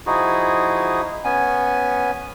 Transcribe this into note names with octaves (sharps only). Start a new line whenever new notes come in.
F3 D#4 E4 F#4 G#4
B3 C#4 G#5